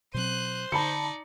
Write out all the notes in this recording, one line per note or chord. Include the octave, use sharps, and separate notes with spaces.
B2 F#3 C4 C5 F#6 D#7
D3 D#4 D5 A5 B5 C#7